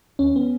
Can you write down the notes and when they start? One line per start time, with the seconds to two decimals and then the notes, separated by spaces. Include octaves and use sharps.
0.19 D#2 C#4
0.36 B3